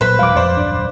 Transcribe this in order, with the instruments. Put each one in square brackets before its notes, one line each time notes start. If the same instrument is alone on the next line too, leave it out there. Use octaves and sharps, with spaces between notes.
[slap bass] A#2 F#3 [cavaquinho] B4 B5 [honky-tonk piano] C5
[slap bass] D#1 F#3 G#3 [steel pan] F5 D6
[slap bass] F2 [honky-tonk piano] C5 D5
[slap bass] D#1 F#2 D4